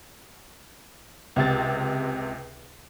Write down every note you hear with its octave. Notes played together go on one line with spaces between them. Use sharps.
C#2 C3 A6